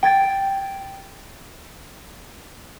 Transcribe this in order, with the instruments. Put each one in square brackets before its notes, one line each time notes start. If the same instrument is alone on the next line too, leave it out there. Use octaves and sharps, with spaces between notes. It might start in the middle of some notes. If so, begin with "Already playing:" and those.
[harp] G5 G#6 A6 D7